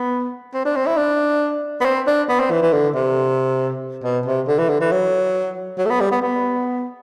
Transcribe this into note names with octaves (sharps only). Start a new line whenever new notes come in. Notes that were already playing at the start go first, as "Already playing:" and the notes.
Already playing: B3
C4
D4
C4
E4
D4
B3
C4
D4
B3
C4
E3
E3
D3
C3
B2
C3
D3
E3
D3
E3
F#3
F#3
A3
B3
G3
B3
B3